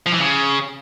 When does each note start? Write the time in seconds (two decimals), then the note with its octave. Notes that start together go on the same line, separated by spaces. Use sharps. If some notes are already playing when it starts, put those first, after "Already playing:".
0.06 F3
0.13 E3
0.20 C#3